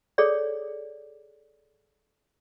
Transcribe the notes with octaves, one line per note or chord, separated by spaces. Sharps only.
G#4 A4 C#5 D5